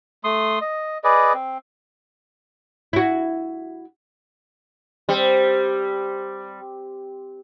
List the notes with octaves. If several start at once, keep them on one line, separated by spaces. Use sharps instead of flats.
A3 C6 D#6
D#5
G#4 B4 D5 D#5
C4
E4 F#4
G3 C4